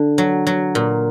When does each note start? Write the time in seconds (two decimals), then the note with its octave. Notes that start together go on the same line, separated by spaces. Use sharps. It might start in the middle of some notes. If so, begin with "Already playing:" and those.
Already playing: D3
0.18 F#3
0.47 F#3
0.75 A#2